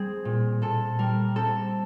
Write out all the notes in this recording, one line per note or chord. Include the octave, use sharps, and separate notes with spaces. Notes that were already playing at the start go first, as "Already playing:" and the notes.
Already playing: G3 C4 G#4
A#2
A#2 A4
G3 A#4
C4 A4